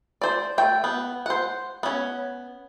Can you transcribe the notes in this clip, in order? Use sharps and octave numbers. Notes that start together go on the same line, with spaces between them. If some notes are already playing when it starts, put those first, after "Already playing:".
C5 D5
A3 G5
B3
C5 F#5
B3 C#4